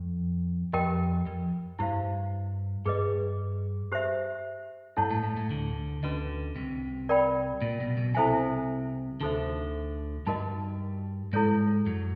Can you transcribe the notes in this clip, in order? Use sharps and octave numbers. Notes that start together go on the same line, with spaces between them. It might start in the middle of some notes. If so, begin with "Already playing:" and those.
Already playing: F2
F2 G4 A#4 D#5 G5
F2
G2 E4 G4 C5 F5
G2 G#4 B4 D#5
G4 C5 E5
G2 E4 A4 C#5 F#5 A5
A2
A2
A2
D2 D3
D2 D3 C#4 F#4 B4 D#5
C2 C3
A#4 D5 G5 B5
A#2
B1 B2
B1 B2
C2 C3 E4 A4 C5 E5 G#5
D2 D3 D#4 F#4 A4 C5 E5
G2 G3 D#4 F#4 A#4 D#5
G#2 G#3 E4 A4 C#5
F#2 F#3